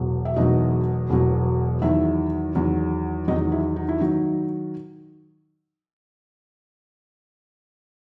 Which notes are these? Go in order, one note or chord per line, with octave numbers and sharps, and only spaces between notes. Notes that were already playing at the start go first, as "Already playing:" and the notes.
Already playing: E1 E2 B2 F#3
E5
E1 E2 B2 F#3 D#4 D#5
E1 E2 B2 F#3
E2 D#3 F#3 E4 E5
E2 D#3 F#3
E2 D#3 F#3 D#4 D#5
E4
D#4
E4
D#3 F#3 D#4